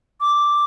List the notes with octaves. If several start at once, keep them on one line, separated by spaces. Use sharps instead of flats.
D6